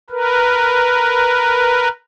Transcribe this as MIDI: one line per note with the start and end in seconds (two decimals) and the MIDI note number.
0.10 1.88 70
0.10 1.88 71